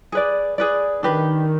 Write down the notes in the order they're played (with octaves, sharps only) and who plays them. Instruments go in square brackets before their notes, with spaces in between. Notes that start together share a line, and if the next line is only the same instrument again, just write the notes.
[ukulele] G#4 B4 D5
G#4 B4 D5
[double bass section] D#3 [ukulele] D4 G4 B4